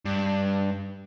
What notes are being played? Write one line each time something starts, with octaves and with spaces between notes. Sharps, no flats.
G2